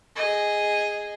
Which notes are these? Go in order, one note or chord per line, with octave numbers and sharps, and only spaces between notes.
G#4 D#5